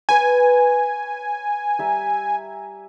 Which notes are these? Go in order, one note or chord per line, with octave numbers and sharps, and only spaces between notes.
B4 C#5 G#5
G3 E5 A#5